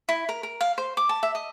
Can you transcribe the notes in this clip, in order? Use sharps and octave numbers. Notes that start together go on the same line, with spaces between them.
E4
A#4
A#4
F5
C5
D6
A5
E5
D#5